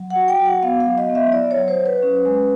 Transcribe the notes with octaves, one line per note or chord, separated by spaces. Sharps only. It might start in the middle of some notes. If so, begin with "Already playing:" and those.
Already playing: F#3
F#5
F#4
G5
F#4
F#5
B3 F5
F5
F#3
D#5
B3
E5
E4 D5
C#5
F#3
C5
F#3
B4
C#4
G#3